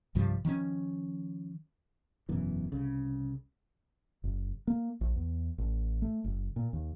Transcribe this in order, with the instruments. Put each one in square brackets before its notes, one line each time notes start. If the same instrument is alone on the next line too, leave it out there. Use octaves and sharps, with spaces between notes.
[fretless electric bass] C2 G2 F3 G3
D#3 F3 B3 C#4
E1 F#2 B2 E3
C2 C#3
[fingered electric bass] F#1
A#3
A#1
E2
A1
A3
F#1
A#2
D#2